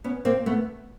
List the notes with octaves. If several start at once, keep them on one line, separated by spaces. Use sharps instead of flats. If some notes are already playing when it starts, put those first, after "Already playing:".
B3 C#4
A#3 C4
A3 B3